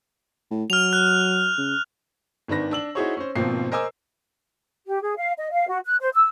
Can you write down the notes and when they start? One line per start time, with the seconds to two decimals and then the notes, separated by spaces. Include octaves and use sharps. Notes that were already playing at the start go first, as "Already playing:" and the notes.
0.51 A2
0.70 F#3 F6 F7
0.93 F#6
1.58 C#3
2.48 G#1 D#3 D4 B4 A#6
2.71 D4 E6 F#7
2.95 D#4 E4 F#4 G#4 C5 C#5
3.17 C#4 C5
3.35 G#1 B2 F3 A#3 C4 C7
3.72 A#4 C5 D#5 G#5 D6 E6
4.86 G4
5.02 G#4
5.17 F5
5.38 D#5
5.51 F5
5.68 F#4
5.85 F#6
6.00 C5
6.14 E6